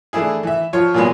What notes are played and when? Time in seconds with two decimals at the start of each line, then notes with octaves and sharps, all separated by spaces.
0.13 E3 A3 D4 E4 G#4
0.43 E3 E5
0.73 F3 F4 C#5
0.94 A#2 E3 F#3 G#3 B3